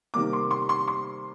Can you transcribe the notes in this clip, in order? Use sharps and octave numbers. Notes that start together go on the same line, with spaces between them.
C3 D#3 G3 A#3 D6
C6
C6
C6
C6